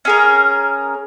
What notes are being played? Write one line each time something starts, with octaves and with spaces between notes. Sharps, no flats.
C#4 G#4 A#4